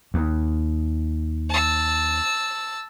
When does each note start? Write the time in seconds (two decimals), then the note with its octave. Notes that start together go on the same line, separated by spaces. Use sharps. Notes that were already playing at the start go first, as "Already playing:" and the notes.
0.14 D#2
1.49 A5 E6